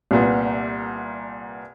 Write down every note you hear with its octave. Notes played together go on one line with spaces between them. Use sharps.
C2 A#2 B3